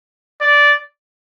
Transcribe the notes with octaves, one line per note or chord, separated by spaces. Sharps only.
D5